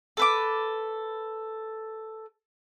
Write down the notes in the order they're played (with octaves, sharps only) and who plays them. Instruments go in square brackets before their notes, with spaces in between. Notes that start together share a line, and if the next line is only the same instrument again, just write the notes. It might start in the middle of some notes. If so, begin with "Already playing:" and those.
[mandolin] A4 B4 D6